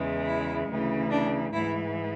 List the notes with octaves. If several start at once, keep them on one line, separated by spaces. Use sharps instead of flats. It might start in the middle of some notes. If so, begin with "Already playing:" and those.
Already playing: E2 C#3 E3 G#3
E4
D2 C#3 E3
D4
G#2 E3 G#3 E4